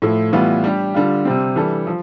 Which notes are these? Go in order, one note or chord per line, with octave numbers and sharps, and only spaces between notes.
A2 F3 A3 E4
A2 E3 G3 B3 F4
G3 D4 G4
D3 G3 D4 F4
C3 G3 C4
E3 G3 D4 A4
F3